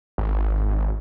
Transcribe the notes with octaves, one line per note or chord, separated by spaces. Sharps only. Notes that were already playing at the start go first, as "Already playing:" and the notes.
G#1